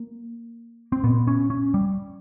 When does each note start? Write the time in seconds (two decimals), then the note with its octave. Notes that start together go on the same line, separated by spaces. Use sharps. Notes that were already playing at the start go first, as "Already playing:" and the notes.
Already playing: A#3
0.92 C4
1.04 A#2 B3
1.28 C#4
1.50 C#4
1.74 G3